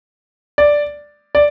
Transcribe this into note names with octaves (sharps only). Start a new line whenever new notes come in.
D5
D5